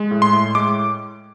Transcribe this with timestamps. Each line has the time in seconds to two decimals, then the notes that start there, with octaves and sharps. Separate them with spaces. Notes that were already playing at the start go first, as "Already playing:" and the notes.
Already playing: G#3
0.11 A2
0.22 C6
0.33 A2
0.55 G#3 D6